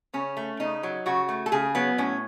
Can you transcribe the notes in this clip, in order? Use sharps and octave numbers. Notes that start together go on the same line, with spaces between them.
C#3 C#4
A3
C#3 D#4
F#3
C#3 F#4
A3
A4
C#3 G#4
F#3 B3
A2 C#4